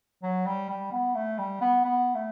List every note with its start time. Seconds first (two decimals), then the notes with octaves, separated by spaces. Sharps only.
0.23 F#3
0.46 G3
0.69 G3
0.92 B3
1.15 A3
1.38 G3
1.61 B3
1.84 B3
2.15 A3